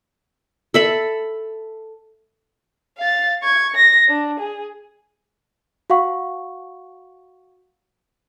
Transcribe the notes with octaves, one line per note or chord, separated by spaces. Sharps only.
A4 E5 B5
F5 A6
C#6 G#6
A#6
D4
G#4
F#4 F5 F#5 C#6